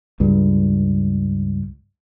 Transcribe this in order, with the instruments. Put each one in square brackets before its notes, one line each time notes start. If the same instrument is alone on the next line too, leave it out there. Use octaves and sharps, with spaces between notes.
[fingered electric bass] C#2 G2